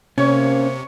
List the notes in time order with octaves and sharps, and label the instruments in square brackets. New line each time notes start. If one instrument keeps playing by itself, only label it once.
[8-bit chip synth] C3 [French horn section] A#3 C5 [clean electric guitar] C#4 [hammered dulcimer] C#5